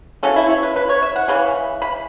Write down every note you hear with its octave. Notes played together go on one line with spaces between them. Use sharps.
C#3 F#3 A3 C#4 A4
E4
C#5
B4
B4
C#5
E5
F#5
C#3 E3 C#4 B5
B5